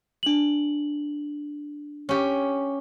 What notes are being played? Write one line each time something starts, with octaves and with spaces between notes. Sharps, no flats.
D4 F#7
C#4 G4